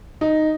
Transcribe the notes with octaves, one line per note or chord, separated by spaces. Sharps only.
D#4